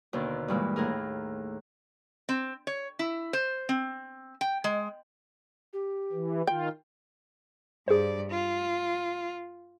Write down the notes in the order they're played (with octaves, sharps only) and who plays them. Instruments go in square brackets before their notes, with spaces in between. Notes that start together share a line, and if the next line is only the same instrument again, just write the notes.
[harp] D#2 B2 D3 D#3
G2 A#2 E3 G#3
D#2 A2 G#4 A#4
[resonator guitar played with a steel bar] C4
C#5
E4
C5
C4
G5
G#3
[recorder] G4
[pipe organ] E3
[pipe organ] D#3 F4 [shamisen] G5
[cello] G2 D5 [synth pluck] G#4 C5
[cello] F4